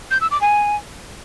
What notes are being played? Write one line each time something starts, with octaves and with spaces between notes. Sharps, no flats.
G6
E6
D6
G#5